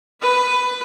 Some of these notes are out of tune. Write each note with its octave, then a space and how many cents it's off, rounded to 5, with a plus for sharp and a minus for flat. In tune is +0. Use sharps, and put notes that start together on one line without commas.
B4 +10 B5 +25